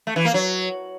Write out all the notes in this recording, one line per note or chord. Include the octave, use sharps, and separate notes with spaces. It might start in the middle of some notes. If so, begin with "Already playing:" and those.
A3
E3
A#3
F#3